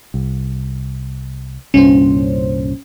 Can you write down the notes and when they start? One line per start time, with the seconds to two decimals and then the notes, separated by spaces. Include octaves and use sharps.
0.14 C2
1.74 C2 G2 A#2 C#4 C5